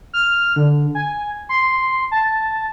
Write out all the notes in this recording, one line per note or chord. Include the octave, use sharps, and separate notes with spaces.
F6
D3
G#5
C6
A5